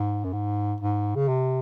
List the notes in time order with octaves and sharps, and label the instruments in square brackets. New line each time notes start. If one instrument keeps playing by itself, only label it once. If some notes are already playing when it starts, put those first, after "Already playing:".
Already playing: [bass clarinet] G#2
F#2
G#2
G#2
C#3
C3